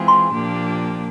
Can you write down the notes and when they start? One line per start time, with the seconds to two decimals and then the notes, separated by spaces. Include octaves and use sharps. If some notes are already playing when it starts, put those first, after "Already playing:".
Already playing: E3 G#3 C4 F4 G#4
0.08 C6
0.33 A#2 F3 A#3 D4 G4